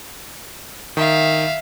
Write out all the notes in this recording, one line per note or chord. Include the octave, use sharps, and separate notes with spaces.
D#3 E5 F5